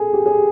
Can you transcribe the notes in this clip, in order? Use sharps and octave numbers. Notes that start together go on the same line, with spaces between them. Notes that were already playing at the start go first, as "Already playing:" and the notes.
Already playing: G#4 A4
G4
G#4